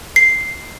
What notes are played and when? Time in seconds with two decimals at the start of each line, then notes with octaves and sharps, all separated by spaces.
0.16 C7